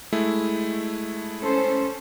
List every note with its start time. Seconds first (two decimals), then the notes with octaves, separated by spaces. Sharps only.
0.12 G#3 A3 E4
1.40 C#4 A4 C5